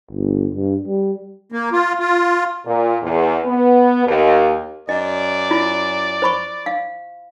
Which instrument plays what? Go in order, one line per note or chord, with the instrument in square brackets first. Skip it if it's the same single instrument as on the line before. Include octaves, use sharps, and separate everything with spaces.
[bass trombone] G1
G2
G3
[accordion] A#3
F4
F4
[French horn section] A#2
E2
B3
D#2
[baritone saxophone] F#2 [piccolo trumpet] D5 [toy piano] D#5
[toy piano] E4 F4
C5 B5 C#6
F5